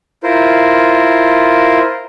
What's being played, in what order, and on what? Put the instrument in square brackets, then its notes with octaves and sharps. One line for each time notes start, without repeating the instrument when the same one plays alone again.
[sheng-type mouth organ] E4 F4 A#4 C5